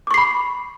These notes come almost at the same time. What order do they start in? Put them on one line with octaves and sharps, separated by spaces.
D6 C#6 C7 B5